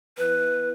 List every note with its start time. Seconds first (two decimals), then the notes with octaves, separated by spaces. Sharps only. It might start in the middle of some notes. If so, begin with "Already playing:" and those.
0.18 E3 B3 E4 B4